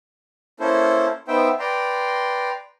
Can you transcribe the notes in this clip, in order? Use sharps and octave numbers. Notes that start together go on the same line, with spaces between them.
A#3 C#4 E4 A4 C5
B3 D#4 C5 E5 G5
B4 D5 G5 A#5 C6